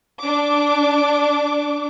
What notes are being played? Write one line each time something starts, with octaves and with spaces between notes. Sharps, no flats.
D4 D6